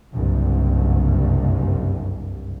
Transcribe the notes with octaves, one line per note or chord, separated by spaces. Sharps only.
F#1 C2 G2